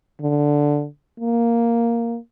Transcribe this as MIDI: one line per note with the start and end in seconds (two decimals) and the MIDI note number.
0.21 0.86 50
1.20 2.17 58